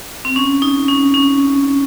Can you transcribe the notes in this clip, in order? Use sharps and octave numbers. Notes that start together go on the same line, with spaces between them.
C4
C#4
D#4
C#4
C#4